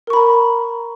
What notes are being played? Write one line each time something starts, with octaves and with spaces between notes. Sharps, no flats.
A#4 A#5 B5 C#6